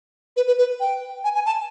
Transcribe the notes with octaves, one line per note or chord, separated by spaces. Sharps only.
B4
B4
B4
G5
G#5
G#5
A5